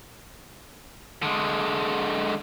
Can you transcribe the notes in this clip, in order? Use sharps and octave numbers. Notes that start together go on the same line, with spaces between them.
D3 G#3